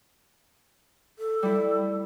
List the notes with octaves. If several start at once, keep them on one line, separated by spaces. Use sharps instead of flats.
A4
G3 E4